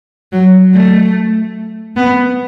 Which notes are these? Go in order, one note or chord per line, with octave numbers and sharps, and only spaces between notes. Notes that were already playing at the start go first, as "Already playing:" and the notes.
F#3
A3
B3